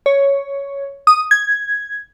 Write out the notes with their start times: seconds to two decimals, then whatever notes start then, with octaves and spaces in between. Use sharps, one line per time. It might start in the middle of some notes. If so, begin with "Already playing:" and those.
0.06 C#5
1.07 D#6
1.31 G#6